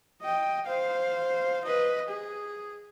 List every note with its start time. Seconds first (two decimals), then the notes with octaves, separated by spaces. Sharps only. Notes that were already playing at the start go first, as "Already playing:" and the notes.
0.22 D#5 G5
0.67 C5 F5
1.65 B4 D#5
2.09 G#4